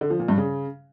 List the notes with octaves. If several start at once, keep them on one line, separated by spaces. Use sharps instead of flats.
D3
F3
A#2
G2
C#3